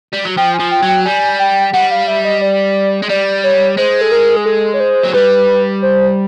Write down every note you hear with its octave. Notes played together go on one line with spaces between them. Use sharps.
G3
F#3
F3 G5
G#5
F3
G5
F#3
G5
G3 G#5
G5
G3 F#5
F5
E5
D#5
D5
G#3
G3 D5
C#5
G#3 C5
A4
A#4
G#4
A4
C#5
C5
F#3
G3 B4
C5